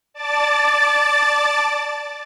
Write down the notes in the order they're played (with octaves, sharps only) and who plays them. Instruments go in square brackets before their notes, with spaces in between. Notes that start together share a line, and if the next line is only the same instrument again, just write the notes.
[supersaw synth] D5 A5 D6 A6